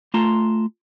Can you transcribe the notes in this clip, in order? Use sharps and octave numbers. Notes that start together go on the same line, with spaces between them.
A3 F4 A5 A#5 C6